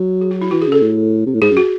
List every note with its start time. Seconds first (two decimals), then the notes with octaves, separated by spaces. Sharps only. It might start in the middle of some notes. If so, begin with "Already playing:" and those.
Already playing: F#3
0.21 G#4
0.31 F#4
0.41 E4
0.51 E3 F#4
0.62 G#4
0.67 C#3 A4
0.82 A2
1.27 C3
1.34 A2
1.42 G#2 G#4
1.51 F#2
1.57 F#4